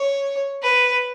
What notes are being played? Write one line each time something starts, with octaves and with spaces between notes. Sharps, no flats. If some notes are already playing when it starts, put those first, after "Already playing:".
Already playing: C#5
B4